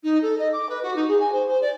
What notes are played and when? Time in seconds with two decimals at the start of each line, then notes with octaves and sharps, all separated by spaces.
0.03 D#4
0.22 A4
0.38 D#5
0.53 D6
0.69 B4
0.83 F#4
0.96 D#4
1.08 G#4
1.19 G#5
1.32 C5
1.48 C5
1.61 D5